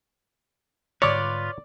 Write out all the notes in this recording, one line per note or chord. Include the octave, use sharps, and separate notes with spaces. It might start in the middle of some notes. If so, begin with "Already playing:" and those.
G#2 D3 G3 F4 B4 C#5 D5 D6